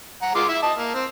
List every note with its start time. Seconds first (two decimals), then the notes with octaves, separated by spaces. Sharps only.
0.22 F#5 A#5
0.35 G#3 F4 D6
0.48 E4 E5
0.63 D#5 A5
0.78 A#3
0.94 C4